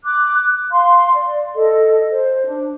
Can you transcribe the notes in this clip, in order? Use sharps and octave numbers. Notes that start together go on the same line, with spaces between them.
D6 F#6
F5 C6
D5
A4 D#5
C5
D4